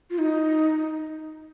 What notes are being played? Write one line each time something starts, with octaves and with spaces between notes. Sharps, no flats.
F4
D#4